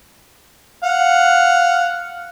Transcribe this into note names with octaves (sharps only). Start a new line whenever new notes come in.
F5 F#5